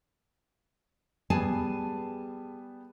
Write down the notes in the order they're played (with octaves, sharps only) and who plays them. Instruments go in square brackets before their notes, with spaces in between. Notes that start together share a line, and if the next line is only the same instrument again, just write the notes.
[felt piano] G3 B3 [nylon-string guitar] G#4 G#5 A5